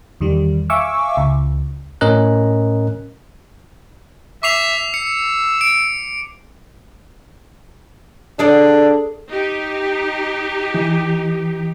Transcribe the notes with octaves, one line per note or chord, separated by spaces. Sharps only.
E2 D#3 G3
E5 F5 G#5 C#6 D6 E6
C#2
A2 C#4 A#4 D#5 F#6
E5 D6 C7 F7
E6 C#7
D7
D4 G#4 A4 D5
D#4 G4
E3